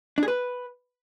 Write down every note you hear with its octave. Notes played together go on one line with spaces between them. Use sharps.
D4
G#4
B4